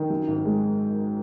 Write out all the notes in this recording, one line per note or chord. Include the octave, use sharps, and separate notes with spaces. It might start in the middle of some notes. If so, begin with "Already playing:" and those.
Already playing: D#3
F#2
G#1
G#3